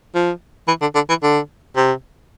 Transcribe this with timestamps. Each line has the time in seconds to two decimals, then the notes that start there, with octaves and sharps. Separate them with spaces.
0.15 F3
0.68 E3
0.81 D3
0.95 D3
1.09 E3
1.23 D3
1.76 C3